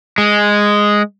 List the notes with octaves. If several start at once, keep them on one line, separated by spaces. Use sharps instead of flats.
G#3